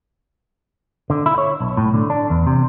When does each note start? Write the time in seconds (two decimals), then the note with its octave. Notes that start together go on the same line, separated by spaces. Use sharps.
1.10 D3
1.26 E4
1.38 C#5
1.60 B1
1.77 A2
1.94 D3
2.10 D4
2.30 E2
2.47 C3